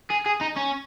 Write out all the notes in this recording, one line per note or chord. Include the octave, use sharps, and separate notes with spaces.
G#4
G#4
D#4
C#4